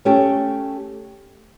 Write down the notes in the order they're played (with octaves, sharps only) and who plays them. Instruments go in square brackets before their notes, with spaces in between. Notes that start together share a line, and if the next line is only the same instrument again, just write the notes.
[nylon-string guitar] A3 C#4 G4